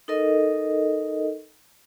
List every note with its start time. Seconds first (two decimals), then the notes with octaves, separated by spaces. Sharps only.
0.08 D#4 A4 A#4 D#5